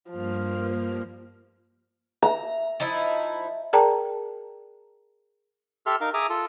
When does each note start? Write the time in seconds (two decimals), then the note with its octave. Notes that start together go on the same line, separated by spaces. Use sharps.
0.11 G2 F3 A#3 F6
2.22 E5 A#5
2.80 F3 D#4 E4
3.73 G#4 A#4 D5 G5 A5 A#5
5.86 G4 A4 E5 C6 F6
6.01 D#4 A#4 F5
6.14 G#4 E5 A#5 D6 D#6
6.29 F4 A4